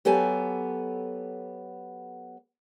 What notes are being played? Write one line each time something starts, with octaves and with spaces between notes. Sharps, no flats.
F#3 B3 G4 A4 G#5